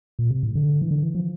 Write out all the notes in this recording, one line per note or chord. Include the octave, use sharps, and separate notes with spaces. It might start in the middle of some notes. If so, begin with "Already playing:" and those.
A#2
C3
A2
D3
E3
D3
E3
F3